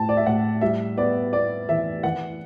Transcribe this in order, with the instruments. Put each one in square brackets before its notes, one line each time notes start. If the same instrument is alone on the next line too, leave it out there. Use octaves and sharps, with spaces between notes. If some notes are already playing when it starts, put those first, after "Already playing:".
Already playing: [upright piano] A2 E4 [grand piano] G5 A5
[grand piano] D5
E5
[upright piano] A2 [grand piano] F#5
[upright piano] G3 [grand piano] E5
[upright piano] B3 [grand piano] D5
[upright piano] B3 [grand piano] D5
[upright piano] E3 [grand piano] E5
[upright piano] E3 [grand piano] F#5